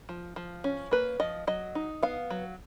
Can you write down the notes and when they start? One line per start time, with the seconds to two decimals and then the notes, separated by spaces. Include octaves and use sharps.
0.09 F3
0.36 F3
0.64 C#4
0.91 A#3 B4
1.20 F3 D#5
1.47 F#3 D#5
1.75 D#4
2.03 B3 F5
2.30 F#3